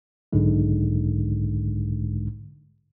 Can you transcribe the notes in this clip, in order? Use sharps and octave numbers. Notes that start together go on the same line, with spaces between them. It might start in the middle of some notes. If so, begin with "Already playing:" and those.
B1 G#2 D3 G#3